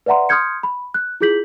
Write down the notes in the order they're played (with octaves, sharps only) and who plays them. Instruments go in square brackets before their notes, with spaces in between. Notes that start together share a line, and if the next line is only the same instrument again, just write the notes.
[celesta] B4 D5 E5 F#5 A#5 C6
C6 D#6 F6 G6 G#6 C#7
B5
F#6
E4 F4 G#4 G6 B6 F#7